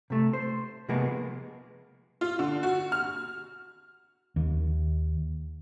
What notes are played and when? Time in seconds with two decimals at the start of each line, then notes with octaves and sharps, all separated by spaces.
0.10 C3 A3
0.33 C5
0.89 C3 F3 G#3 A#3 B3
2.21 F4
2.39 D3
2.63 F#4
2.92 F6
4.36 D#2